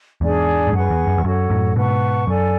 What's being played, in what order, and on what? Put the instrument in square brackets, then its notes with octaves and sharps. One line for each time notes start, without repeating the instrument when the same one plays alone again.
[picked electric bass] E2 G#2 [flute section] D4 G#4 D5 G#5
[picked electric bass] G#2
[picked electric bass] F#2 [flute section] G#4 B4 F#5 C#6
[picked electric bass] E2
F#2
E2
[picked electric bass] F#2 [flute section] F#4 A4 C#5 F#5
[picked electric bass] F#2 A2
[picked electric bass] G#2 B2 [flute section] B4 F#5 A5 C#6
[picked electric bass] F#2 [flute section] A4 D5 G#5